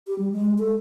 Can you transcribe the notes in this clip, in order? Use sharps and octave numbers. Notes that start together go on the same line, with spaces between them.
G4
G3
G#3
A4